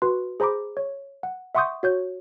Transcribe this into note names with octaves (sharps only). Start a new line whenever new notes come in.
F#4 B4 C6
G#4 C5 A#5 B5 D6
C#5
F#5
E5 F#5 C6 C#6 D#6 G6
F#4 C#5 G6